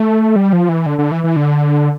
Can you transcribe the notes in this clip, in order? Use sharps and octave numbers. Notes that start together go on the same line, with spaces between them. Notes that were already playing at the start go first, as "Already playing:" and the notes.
Already playing: A3
G3
F3
E3
D3
D3
E3
E3
D3